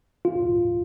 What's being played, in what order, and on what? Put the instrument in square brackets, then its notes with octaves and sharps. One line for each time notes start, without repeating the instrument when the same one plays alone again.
[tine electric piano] F4